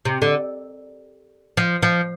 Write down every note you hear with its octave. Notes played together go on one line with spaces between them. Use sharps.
C3
D3
F3
F3